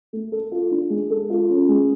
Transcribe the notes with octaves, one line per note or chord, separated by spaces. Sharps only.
A3
A4
F4
D4
G#3
A4
F4
C#4
G#3